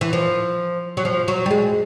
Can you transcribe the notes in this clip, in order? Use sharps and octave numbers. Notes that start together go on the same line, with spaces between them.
E3
F3
F#3
F3
F#3
G3
G#3